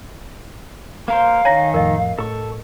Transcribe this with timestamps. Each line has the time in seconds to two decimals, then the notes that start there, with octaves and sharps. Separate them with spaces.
1.08 A#3 A#4 C5 F5
1.45 D#3 D#4 C#5 G#5 A#5 A#6
1.74 F2 A2 A#4 D#5
2.19 A2 A4 C#6